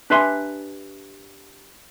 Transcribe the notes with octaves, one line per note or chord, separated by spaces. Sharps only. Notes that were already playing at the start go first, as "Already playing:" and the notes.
D4 G4 B4 E5 G#5 C6